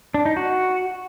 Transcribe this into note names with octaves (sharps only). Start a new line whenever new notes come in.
D4
D#4
F#4